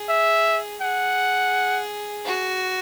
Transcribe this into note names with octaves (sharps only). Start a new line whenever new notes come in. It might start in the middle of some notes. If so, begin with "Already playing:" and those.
Already playing: G#4
E5
G#4 F#5
F#4